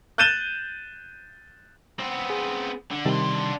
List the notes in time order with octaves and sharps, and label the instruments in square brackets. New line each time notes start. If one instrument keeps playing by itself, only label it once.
[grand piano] F#6 G6 A6 D#7 E7 G7
[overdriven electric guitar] B3 C4
[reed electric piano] G#4
[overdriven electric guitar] D3
[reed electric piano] C3 D#3 G3 [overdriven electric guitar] D4 C6